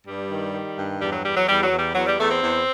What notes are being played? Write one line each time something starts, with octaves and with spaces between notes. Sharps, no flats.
G2 G3
D#3
D#3
G2
E2 G3
F#3
E2 G3
F#3
E2 G3
F#3
E2
G3
E2 F#3
G3
E2 A3
C4
E2